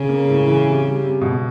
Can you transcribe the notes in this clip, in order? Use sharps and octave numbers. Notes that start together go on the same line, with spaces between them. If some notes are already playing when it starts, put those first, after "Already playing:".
Already playing: C#3 C#4
A#3
A2
E3
C3
G3
C3
B2